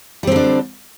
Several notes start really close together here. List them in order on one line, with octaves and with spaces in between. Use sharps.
G3 C4 D3 D4